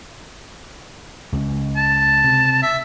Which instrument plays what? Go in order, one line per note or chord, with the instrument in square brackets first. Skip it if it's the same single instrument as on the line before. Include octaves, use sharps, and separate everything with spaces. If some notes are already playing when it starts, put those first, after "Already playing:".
[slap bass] C#2
[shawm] A5
[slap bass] C3
[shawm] E5